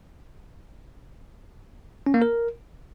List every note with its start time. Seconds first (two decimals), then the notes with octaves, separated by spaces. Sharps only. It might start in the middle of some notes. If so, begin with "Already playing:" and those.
2.06 C#4
2.14 A#3
2.22 A#4